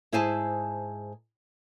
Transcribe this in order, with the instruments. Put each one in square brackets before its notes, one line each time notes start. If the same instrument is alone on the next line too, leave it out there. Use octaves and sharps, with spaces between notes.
[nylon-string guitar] G#2 E4 G#4 C5 G#5 A5